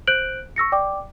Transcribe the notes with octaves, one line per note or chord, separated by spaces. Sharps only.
C5 F#6 G6 D7 F#7
C#6 E6 A#6 C#7
D5 G5 D6